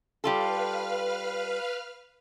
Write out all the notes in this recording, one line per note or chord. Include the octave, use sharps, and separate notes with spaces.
G3 F4 A4 B4 F5 F6